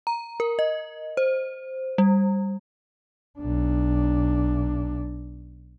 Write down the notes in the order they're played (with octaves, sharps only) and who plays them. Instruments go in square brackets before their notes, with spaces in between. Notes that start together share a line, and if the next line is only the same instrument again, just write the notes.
[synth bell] A#5
A#4
D#5
C5
G3
[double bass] B1 D4